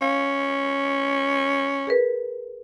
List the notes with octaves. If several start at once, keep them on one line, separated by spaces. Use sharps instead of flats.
C#4 F5
G#4 A#4 B4